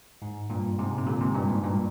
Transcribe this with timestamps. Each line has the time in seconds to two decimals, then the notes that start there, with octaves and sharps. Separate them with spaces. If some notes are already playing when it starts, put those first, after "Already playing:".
0.22 G#2
0.50 G2 A#2
0.78 G#2 C3
0.98 C3
1.07 A#2 D3
1.21 G#2 C3
1.35 G2 A#2
1.49 G#2
1.63 G2 A#2